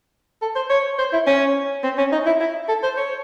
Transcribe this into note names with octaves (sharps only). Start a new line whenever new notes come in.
A4
C5
C#5
C5
E4
C#4
C4
C#4
D#4
E4
E4
A4
C5
C#5